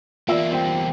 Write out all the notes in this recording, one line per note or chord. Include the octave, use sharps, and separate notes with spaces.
E2 A#3 F4 D5 E5
G3 C4 G5